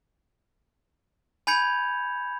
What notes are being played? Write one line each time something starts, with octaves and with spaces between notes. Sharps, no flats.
G#5 B5 G6 G#6 C#7 F7